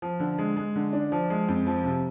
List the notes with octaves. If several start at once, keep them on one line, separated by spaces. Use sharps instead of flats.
F3
D3
G#3
G#3
D3
D4
F3
G#3
F2
F3
C3